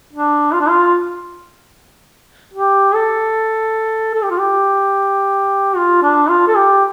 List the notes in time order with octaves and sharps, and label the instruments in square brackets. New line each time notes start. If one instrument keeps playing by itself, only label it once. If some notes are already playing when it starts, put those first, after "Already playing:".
[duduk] D4
F4
D4
F4
G4
A4
A4
G4
F4
G4
F4
D4
F4
A4
G4